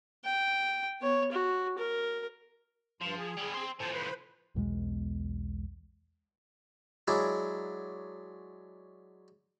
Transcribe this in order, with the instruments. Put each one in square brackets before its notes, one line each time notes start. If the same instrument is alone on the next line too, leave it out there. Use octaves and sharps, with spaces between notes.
[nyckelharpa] G5
B3 C#5
F#4
A#4
[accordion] G2 C6 [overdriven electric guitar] F3
[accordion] G#4
[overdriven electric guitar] G3 B3
C4 C5
[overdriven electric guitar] A2 F3 [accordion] C5 G#5 A5
[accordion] B4 C5 B5
[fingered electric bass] B1 E2 B2 G#3
[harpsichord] F#3 G#3 D4 E4